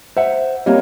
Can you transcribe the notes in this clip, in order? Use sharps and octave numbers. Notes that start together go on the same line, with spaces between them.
C5 E5 F#5
G3 A#3 C4 C#5 D#5